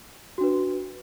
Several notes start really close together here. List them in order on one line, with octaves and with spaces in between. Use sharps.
F#4 D4 B4